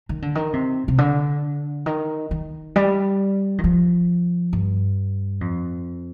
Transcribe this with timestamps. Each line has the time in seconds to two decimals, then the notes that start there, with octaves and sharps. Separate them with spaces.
0.09 D#3
0.22 D3
0.35 D#3
0.53 C3
0.88 C3
0.98 D3
1.86 D#3
2.31 D#3
2.76 G3
3.58 D#3
3.64 F3
4.53 G2
5.41 F2